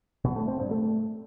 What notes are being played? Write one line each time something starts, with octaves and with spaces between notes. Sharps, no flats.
B2
A3
C4
G2
A3